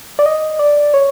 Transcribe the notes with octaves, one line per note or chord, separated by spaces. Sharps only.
D5
D#5
D5
C#5